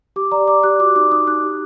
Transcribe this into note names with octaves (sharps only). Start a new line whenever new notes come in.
G4 D6
D5 A#5
D5 D6
G4 F#6
F#4 D6
D#4 D6
D#4 D#6
D#4 F#6
G4